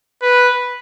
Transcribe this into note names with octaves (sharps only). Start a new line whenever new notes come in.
B4